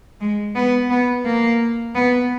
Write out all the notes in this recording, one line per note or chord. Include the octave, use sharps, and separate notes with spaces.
G#3
B3
B3
A#3
B3